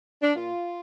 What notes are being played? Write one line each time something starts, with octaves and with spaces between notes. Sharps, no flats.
D4
A#2 F4